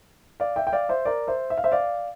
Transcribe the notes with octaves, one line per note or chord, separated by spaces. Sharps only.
D5 F5
E5 G5
G5
D5 F5
C5 E5
A#4 D5
C5 E5
E5
F5
C5 E5
D5 F5